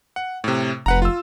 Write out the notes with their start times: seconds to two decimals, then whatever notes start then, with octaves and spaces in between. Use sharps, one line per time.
0.16 F#5
0.44 A2 C3
0.86 F1 B4 F#5 A#5
1.02 F4 E6